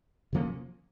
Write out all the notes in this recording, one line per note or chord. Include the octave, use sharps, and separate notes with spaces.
C3 F3 A#3 C#4